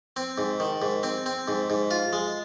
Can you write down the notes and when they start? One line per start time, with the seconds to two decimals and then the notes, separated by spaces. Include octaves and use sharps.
0.16 C4
0.38 G#2
0.60 D#3
0.82 G#2
1.03 C4
1.26 C4
1.48 G#2
1.70 G#2
1.91 F4
2.13 G#3